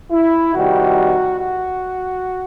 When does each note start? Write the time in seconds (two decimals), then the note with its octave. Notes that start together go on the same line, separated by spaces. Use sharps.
0.12 E4
0.54 C3 D#3 G3 F#4
1.38 F#4